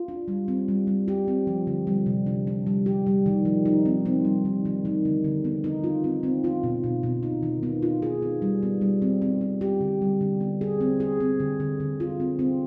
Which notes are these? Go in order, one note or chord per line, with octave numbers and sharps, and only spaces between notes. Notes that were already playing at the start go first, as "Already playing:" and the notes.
Already playing: F4
D4
G3
C4
G3
G3
G4
C4
F3
D3
G3
C3
D4
D4
G3
G4
G3
D#3
F3
D#4
C4
C4
G3
D#3
D#3
D#3
D3
D3
B3
D#4
F4
C4
C4
F4
B2
B2
B2
D#4
D#3
B3
F4
G#4
B3
G3
B3
G3
C4
C4
C4
G4
D3
G3
D3
B3
G#4
C4
G#4
C4
D3
D3
D3
F4
C4
C4